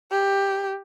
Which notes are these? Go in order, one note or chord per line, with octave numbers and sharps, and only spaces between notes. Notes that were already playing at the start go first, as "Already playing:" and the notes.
G4